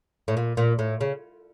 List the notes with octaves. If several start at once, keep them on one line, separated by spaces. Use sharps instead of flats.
A2
A#2
A#2
A2
C#3